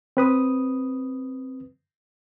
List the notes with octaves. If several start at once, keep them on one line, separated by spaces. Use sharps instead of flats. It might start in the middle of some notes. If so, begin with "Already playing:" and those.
C4 B4 D#6